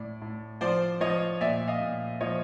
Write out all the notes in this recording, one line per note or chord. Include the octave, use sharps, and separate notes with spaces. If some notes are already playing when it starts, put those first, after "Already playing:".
Already playing: A2 D5
A2
F3 C5 D5
F3 C#5 D#5
A#2 D5 E5
D#5 F5
A#2
F3 C#5 D#5